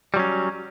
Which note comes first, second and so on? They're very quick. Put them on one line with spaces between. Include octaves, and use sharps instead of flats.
G3 F#3 C#4